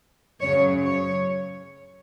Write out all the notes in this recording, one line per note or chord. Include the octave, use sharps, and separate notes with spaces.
F#2 C#3 F#3 C#5
C#5